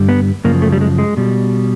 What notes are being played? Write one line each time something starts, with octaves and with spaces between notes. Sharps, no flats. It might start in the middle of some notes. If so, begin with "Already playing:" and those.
Already playing: G2 D3 G3
B3
F#2 C#3 F3 A#3
A3
G3
G#3
G#3
B2 G3